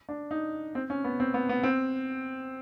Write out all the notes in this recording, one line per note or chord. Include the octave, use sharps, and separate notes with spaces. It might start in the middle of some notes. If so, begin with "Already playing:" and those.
D4
D#4
C4
C#4
B3
C4
B3
B3
C4